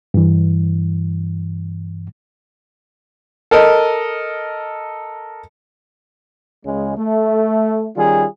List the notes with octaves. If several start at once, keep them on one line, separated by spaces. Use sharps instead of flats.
G2 E3
A4 A#4 D#5
C#2 C#3 G#3
A3
D#3 G3 C#4 F4 G#4